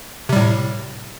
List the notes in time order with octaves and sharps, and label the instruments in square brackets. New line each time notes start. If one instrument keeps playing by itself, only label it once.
[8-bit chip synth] C3
G3
A2